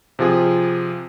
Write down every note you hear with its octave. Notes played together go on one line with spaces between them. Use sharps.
C3 F3 F4 G#4